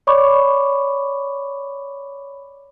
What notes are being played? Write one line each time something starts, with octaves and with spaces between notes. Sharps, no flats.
C#5 D5 B5 C#6 D6